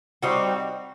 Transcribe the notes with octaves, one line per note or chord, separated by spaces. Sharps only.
G3 C4 D#4 F#4